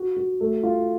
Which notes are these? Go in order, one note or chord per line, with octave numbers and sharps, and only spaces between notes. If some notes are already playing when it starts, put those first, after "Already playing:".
Already playing: F#4
F#4
A3
F4